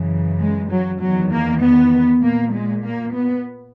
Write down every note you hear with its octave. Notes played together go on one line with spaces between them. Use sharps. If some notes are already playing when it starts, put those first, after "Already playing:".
Already playing: F#2 C#3 E3
G#3
F#3
E2 D#3 F#3
A#3
B3
A#2 A#3
G#3
A#3
B3